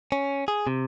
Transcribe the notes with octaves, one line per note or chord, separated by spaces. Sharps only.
C#4
G#4
C3